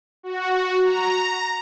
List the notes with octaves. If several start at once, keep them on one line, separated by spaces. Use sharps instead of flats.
F#4
A#5